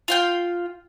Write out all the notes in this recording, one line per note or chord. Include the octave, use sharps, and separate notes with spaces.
F4 F5 G5